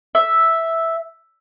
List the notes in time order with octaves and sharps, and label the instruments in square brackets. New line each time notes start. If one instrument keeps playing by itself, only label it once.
[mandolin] E5